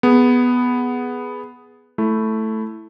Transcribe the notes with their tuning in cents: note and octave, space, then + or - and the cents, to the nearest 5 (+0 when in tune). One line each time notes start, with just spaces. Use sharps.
B3 +0 G#4 +0
A3 +0 E4 +0